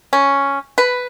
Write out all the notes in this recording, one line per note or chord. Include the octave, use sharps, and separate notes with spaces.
C#4
B4